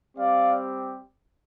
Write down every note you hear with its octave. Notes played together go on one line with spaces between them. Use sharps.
G3 C4 G4 D5 F5